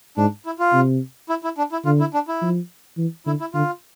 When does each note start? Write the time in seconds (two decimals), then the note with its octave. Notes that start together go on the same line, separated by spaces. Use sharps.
0.17 G#2 D4
0.46 E4
0.59 F4
0.74 C3
1.29 E4
1.44 E4
1.58 D4
1.72 E4
1.85 D3 F4
2.00 E4
2.14 D4
2.28 E4
2.42 F3
2.98 E3
3.26 D3 E4
3.40 E4
3.54 D3 F4